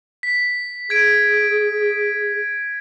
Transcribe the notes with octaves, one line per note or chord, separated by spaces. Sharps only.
B6
G#4 G#6 D7